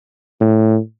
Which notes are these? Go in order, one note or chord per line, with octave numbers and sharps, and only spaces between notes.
A2